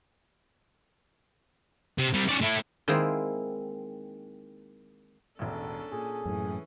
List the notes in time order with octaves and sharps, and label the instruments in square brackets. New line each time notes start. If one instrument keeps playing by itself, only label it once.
[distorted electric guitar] C3
C3 G3
C#4 D5
A3 E4
[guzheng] D#3 G#3 A#3 C4 E4
[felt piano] E1 A1 [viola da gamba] C#4 D4 A4
[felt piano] A#2 [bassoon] G#4
[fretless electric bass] F#2 A2 [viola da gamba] E3 C#4